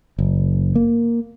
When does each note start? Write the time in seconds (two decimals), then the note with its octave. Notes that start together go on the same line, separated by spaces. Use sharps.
0.18 F#1
0.75 A#3